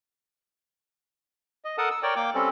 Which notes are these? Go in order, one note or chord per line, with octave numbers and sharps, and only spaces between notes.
D#5
A4 A#4 F#5 A5 D#6
E6
A#4 C#5 D5 G5
A#3 G5 D6
G3 C4 C#4 A4